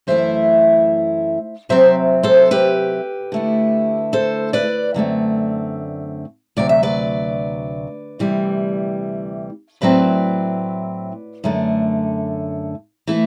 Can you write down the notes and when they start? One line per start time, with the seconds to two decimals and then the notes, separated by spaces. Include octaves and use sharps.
0.07 F#2 E3 A3 E4 C5 E5
1.69 C3 F#3 C4 C5 E5
2.23 A4 C5
2.51 G4 B4
3.32 D3 A3 E4
4.13 A4 C5
4.53 B4 D5
4.94 F#2 D3 A3 C4
6.57 D2 C3 F#3 D5
6.69 E5
6.83 B4 D5
8.19 D2 C3 E3 G3
9.81 A2 F#3 A3 C4 E4 B4 D5
11.44 F#2 D3 A3
13.07 E3 A3 E4